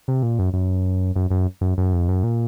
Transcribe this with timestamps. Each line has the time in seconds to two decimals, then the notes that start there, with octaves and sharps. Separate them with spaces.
0.08 C3
0.23 A#2
0.39 F#2
0.53 F#2
1.16 F#2
1.31 F#2
1.61 F#2
1.78 F#2
1.93 F2
2.09 F#2
2.23 A#2